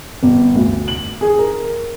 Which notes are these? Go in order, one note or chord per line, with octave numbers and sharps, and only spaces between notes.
G1
D2
F#7
G#4
A#4